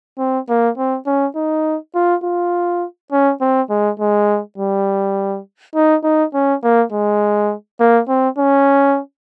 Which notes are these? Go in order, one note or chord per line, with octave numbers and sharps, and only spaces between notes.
C4
A#3
C4
C#4
D#4
F4
F4
C#4
C4
G#3
G#3
G3
D#4
D#4
C#4
A#3
G#3
A#3
C4
C#4